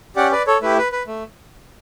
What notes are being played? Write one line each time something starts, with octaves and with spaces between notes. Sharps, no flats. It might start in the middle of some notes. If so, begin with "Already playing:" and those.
C#4 G4 D5 F#5
B4 D5
A4 C#5
A3 E4 G4 B4
B4
B4
A3